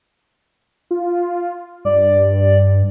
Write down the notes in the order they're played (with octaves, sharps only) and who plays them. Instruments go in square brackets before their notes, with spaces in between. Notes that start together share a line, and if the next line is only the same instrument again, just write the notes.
[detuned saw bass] F4
[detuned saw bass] G2 [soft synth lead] D5